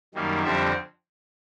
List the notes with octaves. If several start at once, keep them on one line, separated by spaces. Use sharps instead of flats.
F#2 D#3 G3 A#3
F2 D3 G3 C4 E5